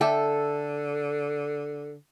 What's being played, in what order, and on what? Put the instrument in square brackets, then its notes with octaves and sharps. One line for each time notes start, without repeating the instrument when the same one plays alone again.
[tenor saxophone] D3 [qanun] A4 [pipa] D5 E5 G5